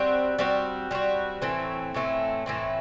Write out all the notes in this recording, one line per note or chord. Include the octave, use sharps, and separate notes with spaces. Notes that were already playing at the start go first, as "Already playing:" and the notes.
Already playing: G3 C4 F#4
G3 C4 F#4
G3 C4 F#4
A2 E3 A3 C4
A2 E3 A3 C4
A2 E3 A3 C4